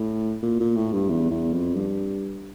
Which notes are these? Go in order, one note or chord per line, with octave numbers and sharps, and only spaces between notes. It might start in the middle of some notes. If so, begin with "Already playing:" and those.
Already playing: A2
A#2
A#2
A2
G2
E2
E2
F2
G2